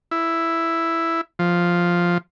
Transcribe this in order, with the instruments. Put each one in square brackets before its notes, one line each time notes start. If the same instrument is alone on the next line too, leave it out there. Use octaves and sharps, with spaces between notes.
[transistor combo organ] E4
F3